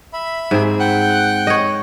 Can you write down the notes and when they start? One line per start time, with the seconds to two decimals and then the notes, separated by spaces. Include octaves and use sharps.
0.13 E5 B5
0.51 G#2 C4 G#4
0.80 F#5 G5 F#6
1.47 C#5 D#5